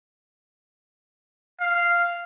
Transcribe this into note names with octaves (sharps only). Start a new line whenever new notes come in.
F5